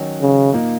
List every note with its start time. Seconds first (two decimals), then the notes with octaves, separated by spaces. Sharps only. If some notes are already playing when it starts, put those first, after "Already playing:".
Already playing: D#3 F#3 C#4 F#4
0.21 C#3
0.53 A#2 A#3 D#4